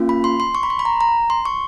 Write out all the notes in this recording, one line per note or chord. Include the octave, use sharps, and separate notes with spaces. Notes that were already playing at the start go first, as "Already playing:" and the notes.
Already playing: A#3 C#4 F4
B5
C6
C6
C#6
B5
C6
B5
A#5
A#5
C6
C#6